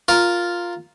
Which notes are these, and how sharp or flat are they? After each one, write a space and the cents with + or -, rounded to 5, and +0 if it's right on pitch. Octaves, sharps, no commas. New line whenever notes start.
F4 +0 A#4 +0